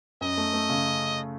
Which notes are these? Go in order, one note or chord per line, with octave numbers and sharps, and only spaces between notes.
F#2 D#5
A3
A3
C#3